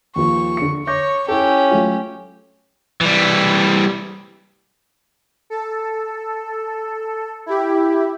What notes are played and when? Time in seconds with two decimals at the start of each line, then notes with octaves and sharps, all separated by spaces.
0.16 D#2 F3 C#6
0.57 D3 C#7
0.87 C#5 C#6 D6 G6 A#6
1.28 C#4 E4 G4 A4
1.71 F#3 A3 F4
3.01 E3 G3
5.50 A4
7.46 E4 G4